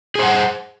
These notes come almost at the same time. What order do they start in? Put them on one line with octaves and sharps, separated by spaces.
G#4 C5 F#5